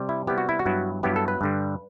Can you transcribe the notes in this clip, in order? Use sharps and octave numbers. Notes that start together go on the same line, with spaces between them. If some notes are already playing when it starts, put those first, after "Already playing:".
Already playing: C3 G3
E4
C3 G3 B3 E4 G4
F#4
E4
F#4
G2 F#3 B3 E4
G2 F#3 B3 E4 G4
A4
B4
G2 D3 G3